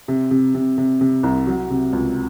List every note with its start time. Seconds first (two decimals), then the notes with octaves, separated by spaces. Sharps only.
0.08 C3
0.31 C3
0.54 C3
0.78 C3
1.01 C3
1.23 C2
1.47 F#3
1.70 C3
1.93 C#2